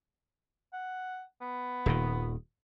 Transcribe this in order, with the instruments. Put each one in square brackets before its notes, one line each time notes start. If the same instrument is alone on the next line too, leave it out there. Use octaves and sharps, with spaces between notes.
[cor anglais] F#5
B3
[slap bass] D#1 A#2 D#3